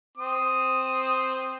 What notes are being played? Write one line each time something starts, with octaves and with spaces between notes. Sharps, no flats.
C4 D#6